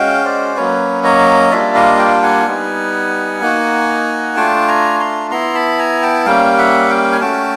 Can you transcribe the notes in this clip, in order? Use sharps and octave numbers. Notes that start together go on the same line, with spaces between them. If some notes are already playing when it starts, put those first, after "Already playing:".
Already playing: G#3 C#4 F#4 F5 G5
C5 D5
F#3 A#3 C#4 B4 C#5
C#5 D#5
G3 A#3 D4 F4 D5 E5
D#5 F5
F5 G5
F#5 G#5
G3 B3 D#4
A#3 D#4 F#4
A3 D4 F4 G5 A5
G#5 A#5
A#5 C6
B3 E4 A#5 C6
A5 B5
G#5 A#5
G5 A5
G3 A#3 C#4 F5 G5
E5 F#5
F5 G5
G#5
A3 C#4 F#4 G5 A5